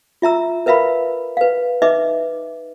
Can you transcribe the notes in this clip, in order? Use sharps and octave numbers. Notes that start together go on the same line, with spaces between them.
F4 E5 A#5 E6
A#4 B4 E5 F5 B5
B4 F5
D#4 B4 D#5 E5 D6